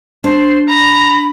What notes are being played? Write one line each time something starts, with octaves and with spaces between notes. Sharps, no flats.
D4 C5
A#5 B5